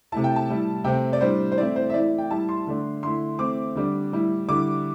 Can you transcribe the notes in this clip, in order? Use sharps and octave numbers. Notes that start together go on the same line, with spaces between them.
C3 A3 E4 A5
G5
A5
A2 G3 E4
C3 A3 C4 G5
D5
A2 G3 D4 C5
C5
E3 A3 C4 E4 D5
C5
E5
E3 A3 E4 D5
G5
A2 G3 E4 A5
C6
D3 A3 D4
D3 A3 E4 C6
E3 A3 C4 E4 D6
D3 G3 D4
A2 G3 E4
D3 G3 E4 D6